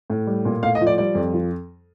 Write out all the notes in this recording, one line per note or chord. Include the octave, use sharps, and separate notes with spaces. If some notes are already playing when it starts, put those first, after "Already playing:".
A2
G3
A#2
A2 F5
D#5
F3
D5
G3 D5
F2
F3